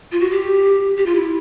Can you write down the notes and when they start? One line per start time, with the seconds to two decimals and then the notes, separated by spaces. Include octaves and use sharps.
0.12 F4
0.20 F#4
0.31 G4
0.97 G4
1.06 F4
1.15 E4